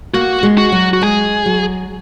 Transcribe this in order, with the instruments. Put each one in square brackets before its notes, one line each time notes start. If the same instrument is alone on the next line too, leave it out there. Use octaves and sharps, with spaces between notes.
[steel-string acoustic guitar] A#3 [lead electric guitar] F#4
[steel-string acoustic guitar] G#3
[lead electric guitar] F#4
[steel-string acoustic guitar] F#3
[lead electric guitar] F#4
[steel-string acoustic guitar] G#3 [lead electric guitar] G#4
[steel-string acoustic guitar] F#3